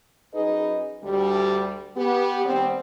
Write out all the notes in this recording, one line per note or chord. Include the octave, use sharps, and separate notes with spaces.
F#2 D#4 G#4 B4 D#5
D2 G3
B3 G4
D#2 G3 B3 C4